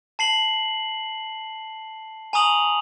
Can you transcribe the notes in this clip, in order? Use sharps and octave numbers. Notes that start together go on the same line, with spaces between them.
A5 C7 F#7
G#5 A#5 C#6 D#6 F7 F#7